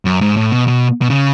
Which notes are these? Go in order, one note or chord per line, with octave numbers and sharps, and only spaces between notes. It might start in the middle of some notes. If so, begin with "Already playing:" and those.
F#2
G#2
A2
B2
B2
B2
C#3